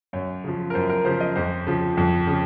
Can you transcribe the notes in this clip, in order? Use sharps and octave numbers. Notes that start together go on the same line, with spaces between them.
F#2 C#5
C#3 F3
A#4
F#2 C5
A#4
C#3 F3 C5
D#5
F2 C5
C#3 F3
F2
C#3